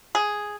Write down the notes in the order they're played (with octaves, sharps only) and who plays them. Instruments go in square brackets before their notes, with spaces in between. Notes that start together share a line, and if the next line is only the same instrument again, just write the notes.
[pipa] G#4